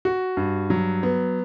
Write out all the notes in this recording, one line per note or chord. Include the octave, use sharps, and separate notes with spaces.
F#4
G2
F#3
B3